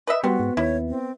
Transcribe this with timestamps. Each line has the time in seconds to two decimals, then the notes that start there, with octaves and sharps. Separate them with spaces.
0.07 B4 D#5 E5
0.24 G3 B3 C4 F#4
0.39 G#2
0.57 D#2 E4 C#5
0.89 C4